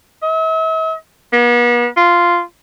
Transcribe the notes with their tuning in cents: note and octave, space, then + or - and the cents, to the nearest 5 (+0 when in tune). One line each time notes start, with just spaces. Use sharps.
E5 -45
B3 -45
F4 -5